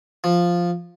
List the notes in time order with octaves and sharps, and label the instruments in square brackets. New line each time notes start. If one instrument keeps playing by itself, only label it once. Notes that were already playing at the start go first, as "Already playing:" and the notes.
[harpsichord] F3